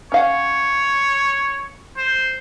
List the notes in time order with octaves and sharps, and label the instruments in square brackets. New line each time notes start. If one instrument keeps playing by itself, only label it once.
[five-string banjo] C#4 F5 F#5 [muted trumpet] C#5
[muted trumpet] C5